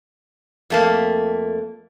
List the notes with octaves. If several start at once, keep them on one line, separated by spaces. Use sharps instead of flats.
F2 A3 A#3